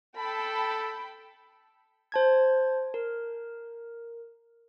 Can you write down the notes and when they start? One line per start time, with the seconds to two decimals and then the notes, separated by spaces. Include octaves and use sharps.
0.17 A4 G5 A5 B5
2.12 C5 A5 G#6
2.94 A#4